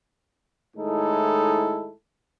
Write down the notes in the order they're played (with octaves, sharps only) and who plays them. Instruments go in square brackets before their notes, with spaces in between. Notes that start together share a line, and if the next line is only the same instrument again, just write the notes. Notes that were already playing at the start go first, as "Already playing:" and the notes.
[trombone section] A2 D#3 G#3 D#4 E4 A4